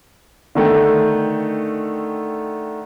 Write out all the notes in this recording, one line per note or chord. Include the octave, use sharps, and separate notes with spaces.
D3 D#3 A3 G5